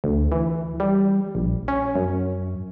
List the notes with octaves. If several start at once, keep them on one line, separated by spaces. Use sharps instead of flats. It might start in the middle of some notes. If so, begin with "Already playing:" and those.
D2
E3
G3
A#1
C#4
F#2